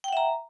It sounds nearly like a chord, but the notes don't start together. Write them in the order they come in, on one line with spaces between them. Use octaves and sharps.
G5 F#5 E5 A#5